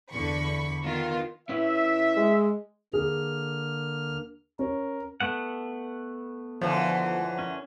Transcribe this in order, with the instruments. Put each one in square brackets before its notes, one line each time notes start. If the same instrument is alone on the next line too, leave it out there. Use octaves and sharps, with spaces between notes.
[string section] E2 D3 B5 C#6
D#3 B3 F4 A#4
[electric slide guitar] C#4 E4 B4 [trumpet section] E5
[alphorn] G#3
[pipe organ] D3 A#3 F6 [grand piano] G#4
[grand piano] C#4 [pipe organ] A#4
[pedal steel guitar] A3 B3 F#5
[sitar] F#2 D3 E3 [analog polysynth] F3
[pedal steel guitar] C#4